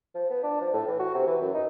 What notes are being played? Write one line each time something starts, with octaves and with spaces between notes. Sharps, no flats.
F3
B3
D4
F3
A2
E3
F#4
C3
E3
F#2
D#4